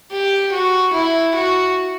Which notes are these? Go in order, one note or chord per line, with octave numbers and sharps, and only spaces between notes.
G4
F#4
E4
F#4